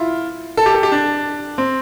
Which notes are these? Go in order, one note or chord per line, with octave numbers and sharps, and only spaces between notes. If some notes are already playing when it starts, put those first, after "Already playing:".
Already playing: E4 F4
A4
G4
A4
G4
D4
C4